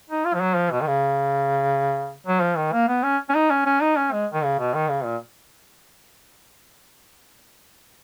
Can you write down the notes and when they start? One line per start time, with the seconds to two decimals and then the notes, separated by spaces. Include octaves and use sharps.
0.09 D#4
0.25 F4
0.34 F3
0.41 F#3
0.56 F3
0.71 B2
0.81 D#3
0.87 C#3
2.27 F#3
2.42 F3
2.57 D#3
2.73 A#3
2.88 B3
3.04 C#4
3.29 C#4
3.35 D#4
3.51 C#4
3.66 C#4
3.81 D#4
3.97 C#4
4.12 G#3
4.33 D#3
4.44 C#3
4.59 B2
4.74 D#3
4.89 C#3
5.05 A#2